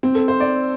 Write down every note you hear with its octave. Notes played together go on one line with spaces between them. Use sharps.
C4
A4
C5
D5